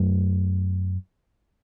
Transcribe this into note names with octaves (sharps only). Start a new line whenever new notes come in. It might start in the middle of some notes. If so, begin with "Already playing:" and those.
Already playing: F#2 F#3 A3